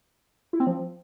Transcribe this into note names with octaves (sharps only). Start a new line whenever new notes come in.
E4
C4
F3